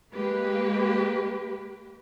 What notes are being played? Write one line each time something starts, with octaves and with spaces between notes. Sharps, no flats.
G#3 A#3 G4 B4